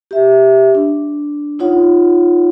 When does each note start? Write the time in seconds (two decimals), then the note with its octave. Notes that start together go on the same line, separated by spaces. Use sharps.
0.11 G4 E5
0.75 D4
1.59 D#4 F4 C#5 F#5